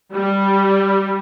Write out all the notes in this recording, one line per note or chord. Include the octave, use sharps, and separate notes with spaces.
G3